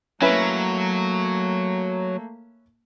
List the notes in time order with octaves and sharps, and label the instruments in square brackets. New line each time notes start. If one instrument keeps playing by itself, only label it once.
[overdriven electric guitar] F#3 [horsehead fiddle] A3 A#3 [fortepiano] C#4 E4 B4